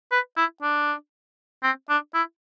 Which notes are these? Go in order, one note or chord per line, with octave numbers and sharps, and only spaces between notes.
B4
E4
D4
C4
D4
E4